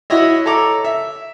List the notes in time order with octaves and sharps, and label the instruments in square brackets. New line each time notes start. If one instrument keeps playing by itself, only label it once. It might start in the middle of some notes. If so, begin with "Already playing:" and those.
[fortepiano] E4 F#4 C#5 D#5 E5
A4 C#5 A#5 D6
E5